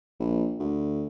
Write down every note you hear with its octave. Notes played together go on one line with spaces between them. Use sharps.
A#1
D2